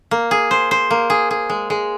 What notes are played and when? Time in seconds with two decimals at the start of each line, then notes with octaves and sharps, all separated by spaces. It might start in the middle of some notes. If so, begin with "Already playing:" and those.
0.11 A#3
0.31 G#4
0.51 C5
0.71 C5
0.91 A#3
1.10 G#4
1.31 G#4
1.50 G#3
1.70 G#3